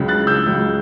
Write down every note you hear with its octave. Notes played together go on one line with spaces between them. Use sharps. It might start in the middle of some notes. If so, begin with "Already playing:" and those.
Already playing: C#2 C#3 F#3
F#6 A6
E6 G6
C#2 C#3 F#3